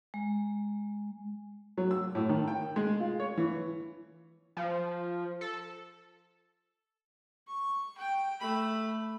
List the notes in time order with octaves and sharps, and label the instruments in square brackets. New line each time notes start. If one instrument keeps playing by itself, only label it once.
[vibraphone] G#3
[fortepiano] F#3
E6
A2
D#3
G5
G#3
F4
C#5
E3
[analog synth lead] F3
A4
[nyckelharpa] C#6
G5
A3 B5